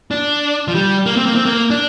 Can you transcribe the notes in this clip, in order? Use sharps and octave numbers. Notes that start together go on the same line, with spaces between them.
D4
F3
G3
A#3
C4
A#3
C4
A#3
D4